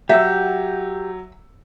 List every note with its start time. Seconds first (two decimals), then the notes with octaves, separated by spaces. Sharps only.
0.09 F#3 G4 E5 F#5 E6 G6